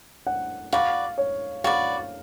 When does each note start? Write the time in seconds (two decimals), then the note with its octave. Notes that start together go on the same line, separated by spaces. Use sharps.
0.27 F#5
0.72 F#4 B4 D5 F5
1.18 C#5
1.64 F#4 B4 D5 F5